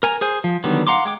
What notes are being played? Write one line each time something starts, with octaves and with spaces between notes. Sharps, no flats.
A#4 G#5 A#5
G#4 C5 G#5
F3
D3 D#3 F#3 G3 B3
F5 F#5 A#5 C6 D6
G#3 G5 D6